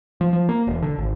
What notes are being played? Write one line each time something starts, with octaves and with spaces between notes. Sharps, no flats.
F3
F3
A#3
E1
D3
G#1